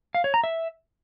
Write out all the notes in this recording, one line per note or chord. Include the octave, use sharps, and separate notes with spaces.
F5
C#5
A#5
E5